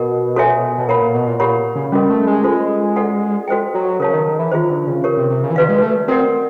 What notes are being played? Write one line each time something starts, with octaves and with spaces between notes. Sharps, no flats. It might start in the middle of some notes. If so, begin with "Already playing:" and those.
Already playing: B2 A#4 D#5 F#5
F#4 A4 C#5 E5 G#5
B2
A#2 A#4 C#5 F#5 B5
A#2
B2
A#2
A#2 G4 A#4 C#5 F#5 B5
C#3
G3 C#4 F#4 A#4 D#5
A3
G#3
F4 A4 C5
F#4 A4 D5 F#5
F#4 A4 C5 D#5 G5
F#3
C#3 A#4 C#5 F5 A5
D#3
D#3
E3
D#3 F4 G#4 C5
D3
C#3
G4 A#4 C#5
C3
C3
C#3
E3
D#3 F#4 B4 D5 F5
G#3
A3
C4 F#4 A#4 D5 F#5